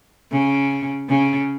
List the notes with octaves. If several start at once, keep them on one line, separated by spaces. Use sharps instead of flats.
C#3
C#3